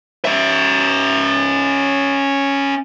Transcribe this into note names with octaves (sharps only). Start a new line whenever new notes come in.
C#4 E5